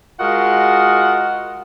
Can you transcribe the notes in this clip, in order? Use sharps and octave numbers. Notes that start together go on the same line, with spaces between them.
G#3 F4 F#4 A#4 D#5 F#5